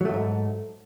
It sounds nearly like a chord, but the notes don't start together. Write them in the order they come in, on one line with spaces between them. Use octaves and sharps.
F#3 A3 E2 G#2